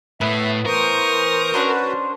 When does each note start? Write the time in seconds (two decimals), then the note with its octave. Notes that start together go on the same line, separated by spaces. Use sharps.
0.21 A2 A3 B3 E5
0.66 E3 A#4 C5 C#6 D#6
1.54 C#4 D4 F#4 B4 C5